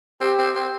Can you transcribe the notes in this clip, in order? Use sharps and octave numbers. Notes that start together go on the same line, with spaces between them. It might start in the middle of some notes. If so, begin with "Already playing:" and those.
C4 G4
C4
C4